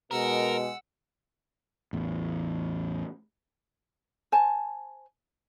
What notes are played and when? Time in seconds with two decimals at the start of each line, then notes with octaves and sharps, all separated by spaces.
0.11 B2 G#3 A#4 F#5 E6
1.93 A1 E2
4.32 C5 G#5 A5